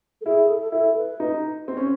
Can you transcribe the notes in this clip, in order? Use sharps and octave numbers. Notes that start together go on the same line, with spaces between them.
A4
E4 G#4
A4
E4 A4
B4
D#4
C4
C#4